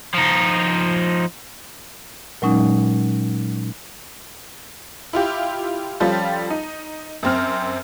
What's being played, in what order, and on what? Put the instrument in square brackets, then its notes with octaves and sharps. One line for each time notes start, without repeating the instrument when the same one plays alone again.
[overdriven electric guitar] F3 D#4
[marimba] A#2 F#3 G#3 C#4 D#4
[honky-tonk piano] E4 F4 G4
F3 G3 C#4 F4 A4
D#4
F#2 C4 F6